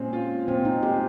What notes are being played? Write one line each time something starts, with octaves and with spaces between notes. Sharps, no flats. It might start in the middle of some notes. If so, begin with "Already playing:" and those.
Already playing: A#2 G#3 C4 C#4
F4
A#2 C4
D#4
G#3 G4